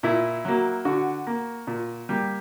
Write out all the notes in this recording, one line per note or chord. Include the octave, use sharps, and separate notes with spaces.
A#2 E4
F#3 A#3
D3 F#4
A#3
A#2
G3 A#3